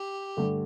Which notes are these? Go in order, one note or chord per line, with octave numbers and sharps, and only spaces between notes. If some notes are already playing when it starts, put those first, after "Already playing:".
Already playing: G4
G2 D3 A3